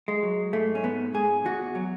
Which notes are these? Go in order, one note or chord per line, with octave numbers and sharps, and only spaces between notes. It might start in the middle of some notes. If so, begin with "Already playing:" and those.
G#3
F#3
G#2 A3
C#4
G#2 B3
G#2 G#4
E2 F#4
F#3